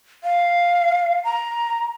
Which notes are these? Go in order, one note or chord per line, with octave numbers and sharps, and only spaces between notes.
F5
A#5